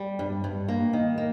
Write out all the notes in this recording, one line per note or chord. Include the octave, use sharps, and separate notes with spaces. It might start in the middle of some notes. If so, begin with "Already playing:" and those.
Already playing: G3
G2
G2
A#3
D#3
A#3